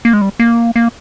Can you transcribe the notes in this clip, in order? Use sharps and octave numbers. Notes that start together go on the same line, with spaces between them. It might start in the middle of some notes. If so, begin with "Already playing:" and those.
A#3
G#3
G3
A#3
A#3